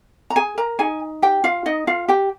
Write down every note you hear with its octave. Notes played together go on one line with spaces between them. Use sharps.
A#5
G#4 G#5
A#4 A#5
D#4 G#4 G#5
G4 G5
F4 F5
D#4 D#5
F4 F5
G4 G5